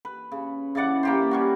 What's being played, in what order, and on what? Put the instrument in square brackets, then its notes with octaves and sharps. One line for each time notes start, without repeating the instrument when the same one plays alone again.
[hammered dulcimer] B4
C#3
C#3 E3 D5 F#5
A#3 G4 C5
G3 C#4 F#4